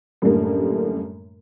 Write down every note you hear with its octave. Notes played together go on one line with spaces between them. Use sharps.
F#2 A2 D3 G3 A3 A#3